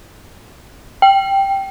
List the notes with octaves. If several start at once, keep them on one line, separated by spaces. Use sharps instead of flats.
G5